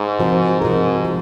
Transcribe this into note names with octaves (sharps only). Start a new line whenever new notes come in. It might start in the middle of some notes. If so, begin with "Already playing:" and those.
Already playing: G#2
C3 F3 C4 F#4 A#4
G#2 C3 F3 C4 F#4 A#4
C3 F3 G#3